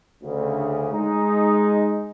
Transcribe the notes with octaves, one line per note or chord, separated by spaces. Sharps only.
D2 C#3
G#3 D#4